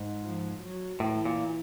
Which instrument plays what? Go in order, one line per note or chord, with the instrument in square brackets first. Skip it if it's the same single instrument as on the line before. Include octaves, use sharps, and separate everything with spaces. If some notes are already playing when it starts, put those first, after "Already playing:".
Already playing: [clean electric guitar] G#2
[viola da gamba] F3
F#3
[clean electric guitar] A2 [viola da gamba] E3
[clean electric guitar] A#2